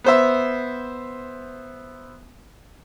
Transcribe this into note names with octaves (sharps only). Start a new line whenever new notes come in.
B3 C5 E5